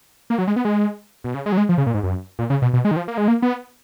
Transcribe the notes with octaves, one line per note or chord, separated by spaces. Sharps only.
A#3
F#3
G#3
B3
G#3
B2
C#3
G#3
F#3
G#3
F3
C#3
A#2
G#2
F#2
A#2
C#3
B2
B2
G#3
D#3
F3
A#3
G#3
A#3
B3